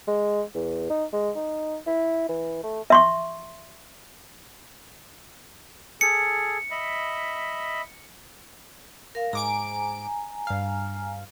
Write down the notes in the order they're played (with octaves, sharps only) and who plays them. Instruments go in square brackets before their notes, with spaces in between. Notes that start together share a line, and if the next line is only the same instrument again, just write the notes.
[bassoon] G#3
E2
D#4
G#3
D#4
E4
E3
A3
[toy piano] E5 C6 C#6
[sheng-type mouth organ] G#4 A4 [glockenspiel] C#7
[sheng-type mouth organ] D#5 E5 B5
[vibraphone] A#4 F5
[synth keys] G#2 D6 D7 [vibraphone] G#5 A#5
[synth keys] G2 F5